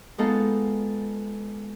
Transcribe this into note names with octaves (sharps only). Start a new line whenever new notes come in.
G#3 B3 D#4 F4 A4